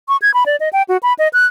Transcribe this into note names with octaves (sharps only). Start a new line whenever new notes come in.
C#6
G#6
B5
D5
D#5
G5
F#4
B5
D#5
F#6